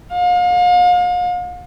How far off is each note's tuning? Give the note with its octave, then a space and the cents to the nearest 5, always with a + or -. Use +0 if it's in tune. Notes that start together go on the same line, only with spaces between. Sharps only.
F5 +40